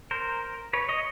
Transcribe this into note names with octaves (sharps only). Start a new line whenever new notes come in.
A#4 C5
B4 C#5
C#5 D#5